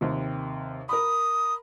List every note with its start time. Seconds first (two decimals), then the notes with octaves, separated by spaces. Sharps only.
0.01 D#2 C3
0.89 A#4 B5 D#6